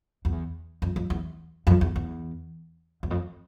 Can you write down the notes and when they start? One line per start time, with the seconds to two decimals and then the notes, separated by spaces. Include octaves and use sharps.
0.25 E2
0.82 F2
0.96 F2
1.10 E2
1.67 F2
1.81 E2
1.96 E2
3.03 E2
3.11 F2